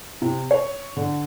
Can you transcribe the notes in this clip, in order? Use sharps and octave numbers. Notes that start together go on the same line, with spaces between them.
C3
C#5
D3